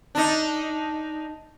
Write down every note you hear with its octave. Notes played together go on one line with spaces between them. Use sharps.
D4 D#4